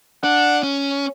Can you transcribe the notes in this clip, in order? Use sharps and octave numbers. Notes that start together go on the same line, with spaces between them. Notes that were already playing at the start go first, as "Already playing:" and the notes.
D4 F#5
C#4